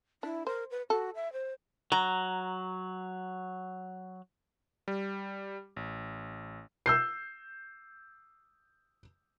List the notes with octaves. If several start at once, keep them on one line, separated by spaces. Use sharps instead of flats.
D4 E4
A#4 C5
B4
F#4 A4
E5
C5
F#3 A#5
G3
A1
E6 G6 C7